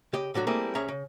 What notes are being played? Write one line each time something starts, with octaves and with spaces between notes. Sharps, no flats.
C#3 G4 D#5
A2 D3 F#3 F#4
G3 A3 A#3 C4 E4 G#4
C2 C#4 G#4 E5 A#5
C#3